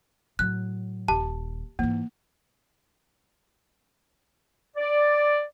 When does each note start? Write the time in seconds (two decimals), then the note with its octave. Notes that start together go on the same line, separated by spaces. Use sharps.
0.39 A2 F#3 F#6
1.08 D#1 G4 A5
1.79 G#2 E3 A#3
4.76 D5